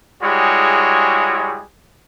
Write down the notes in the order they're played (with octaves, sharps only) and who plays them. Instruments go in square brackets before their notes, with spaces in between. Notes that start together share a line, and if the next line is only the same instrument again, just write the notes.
[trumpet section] G3 G#3 E4 F#4 G#4 C#5